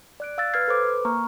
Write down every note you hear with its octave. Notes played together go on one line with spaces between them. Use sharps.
D5 F#6 D7
F5 E6 F#6 A6
B4 E6 F6 G#6 C7
A4 B4 C5 D6
A#3 A#5 C#6 F6